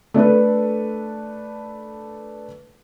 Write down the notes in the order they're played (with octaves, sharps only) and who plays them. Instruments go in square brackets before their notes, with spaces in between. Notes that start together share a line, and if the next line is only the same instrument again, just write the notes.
[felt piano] A3 D4 A4 B4